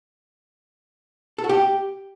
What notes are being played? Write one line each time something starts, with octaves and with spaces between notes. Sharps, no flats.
A4
F#4
G4